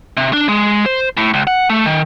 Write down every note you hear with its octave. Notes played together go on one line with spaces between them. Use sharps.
C3
D4
G#3
C5
A2
C#2
F#5
A3
D#3